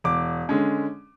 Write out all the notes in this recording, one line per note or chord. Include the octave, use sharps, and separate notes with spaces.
E1 D6
D3 G#3 C#4